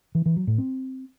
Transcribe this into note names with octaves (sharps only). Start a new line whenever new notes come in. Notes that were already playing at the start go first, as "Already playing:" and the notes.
E3
E3
F#3
A2
C4